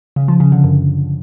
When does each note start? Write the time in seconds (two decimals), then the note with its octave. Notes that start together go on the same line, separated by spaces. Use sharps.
0.16 C#3
0.28 F3
0.40 C#3
0.52 D3
0.64 F#2